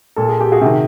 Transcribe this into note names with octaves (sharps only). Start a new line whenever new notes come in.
A#2 A4
G#4
G4
F#4 G#4
C3 D#3